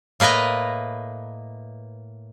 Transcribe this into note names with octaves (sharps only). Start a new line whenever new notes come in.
A2 A#3 B4 D#5 A#5